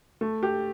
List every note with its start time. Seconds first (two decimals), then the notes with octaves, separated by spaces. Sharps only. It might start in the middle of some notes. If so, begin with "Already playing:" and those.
0.21 A3
0.43 G4